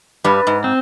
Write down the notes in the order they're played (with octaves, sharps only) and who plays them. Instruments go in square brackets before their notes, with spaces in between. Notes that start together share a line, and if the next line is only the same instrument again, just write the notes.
[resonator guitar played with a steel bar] G2 G3 [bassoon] B4
[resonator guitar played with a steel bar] G#2
[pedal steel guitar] C4